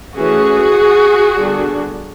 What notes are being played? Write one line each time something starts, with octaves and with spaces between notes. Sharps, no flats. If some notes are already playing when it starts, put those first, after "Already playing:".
E3 A3 C#4 F#4 G#4
D3 G3 B3 D4